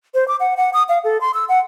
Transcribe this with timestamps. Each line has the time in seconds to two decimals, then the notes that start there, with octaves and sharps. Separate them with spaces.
0.14 C5
0.28 D6
0.40 F#5
0.57 F#5
0.74 D#6
0.89 F5
1.04 A4
1.21 C6
1.34 E6
1.49 F#5